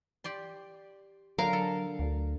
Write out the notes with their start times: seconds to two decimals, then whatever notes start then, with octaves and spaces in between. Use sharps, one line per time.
0.24 G4 D5 C6
1.38 D3 F#3 A#4 F5
1.53 A4
1.99 D2